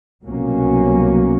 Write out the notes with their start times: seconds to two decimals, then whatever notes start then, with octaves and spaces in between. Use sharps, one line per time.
0.23 C2 B2 F#3 A#3 C#4